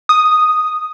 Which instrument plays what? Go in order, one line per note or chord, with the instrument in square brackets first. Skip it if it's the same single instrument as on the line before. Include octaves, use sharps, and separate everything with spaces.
[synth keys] D#6